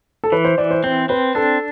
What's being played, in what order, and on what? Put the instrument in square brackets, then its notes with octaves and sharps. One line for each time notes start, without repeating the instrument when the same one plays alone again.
[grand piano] A4
[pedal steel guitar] E3 [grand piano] B4
[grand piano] C5
[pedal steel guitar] E3 [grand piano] D5
[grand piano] C5
[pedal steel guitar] C4 [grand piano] C5
[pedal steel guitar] C4 [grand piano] B4
[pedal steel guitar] D4 [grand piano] A4